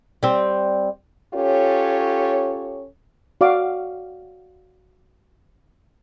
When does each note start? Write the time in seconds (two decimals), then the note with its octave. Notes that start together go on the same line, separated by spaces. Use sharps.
0.23 G3 C4
1.34 C#4 F4 G4 A4 C#5
3.41 F#4 D5 F5 D6